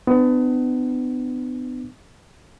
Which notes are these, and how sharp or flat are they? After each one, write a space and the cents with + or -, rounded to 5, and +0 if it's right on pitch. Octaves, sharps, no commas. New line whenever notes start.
B3 +30 D4 +35